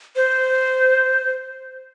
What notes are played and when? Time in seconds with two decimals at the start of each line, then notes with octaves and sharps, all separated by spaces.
0.16 C5